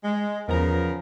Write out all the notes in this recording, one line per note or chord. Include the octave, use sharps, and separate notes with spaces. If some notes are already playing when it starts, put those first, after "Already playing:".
G#3
E2 C#3 F3 B3 A#4 A#5